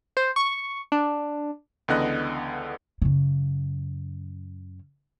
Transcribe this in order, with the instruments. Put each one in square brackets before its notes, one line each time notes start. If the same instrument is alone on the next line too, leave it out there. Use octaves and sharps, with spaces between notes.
[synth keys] C5
C#6
D4
[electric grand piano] C#2 D3 E3 B3 D#5 F#6
[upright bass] F#2 C#3